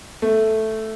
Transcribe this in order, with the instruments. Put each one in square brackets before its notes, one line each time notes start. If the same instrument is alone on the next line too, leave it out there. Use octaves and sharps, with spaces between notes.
[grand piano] A3